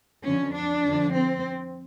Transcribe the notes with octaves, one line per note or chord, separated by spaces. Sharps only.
F2 D3 F3 C#4
D4
F2 D3 F3
C4